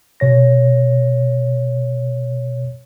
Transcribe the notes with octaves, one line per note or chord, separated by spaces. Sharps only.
B2 C#5 A#6